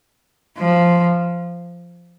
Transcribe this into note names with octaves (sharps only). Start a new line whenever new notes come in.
F3